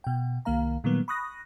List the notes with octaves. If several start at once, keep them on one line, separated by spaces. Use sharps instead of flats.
B2 G5
C2 D#3 A#3 F5 A#5
A#2 D#3 F#3 G3 A#3 B3
B5 C#6 D#6 F#6 A#6